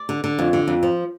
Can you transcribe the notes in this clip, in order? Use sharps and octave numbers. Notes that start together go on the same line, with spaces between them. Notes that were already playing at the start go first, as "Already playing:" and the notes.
Already playing: D5
D3
D3
F2
D3
F2
F3